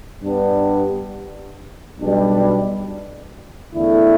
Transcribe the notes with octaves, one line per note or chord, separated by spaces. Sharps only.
G2 G3 B3 D4 G4
B1 B2 G3 D4
E2 D3 A3 E4